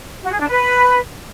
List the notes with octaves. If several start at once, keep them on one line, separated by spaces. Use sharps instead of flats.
F#4
G#4
D4
B4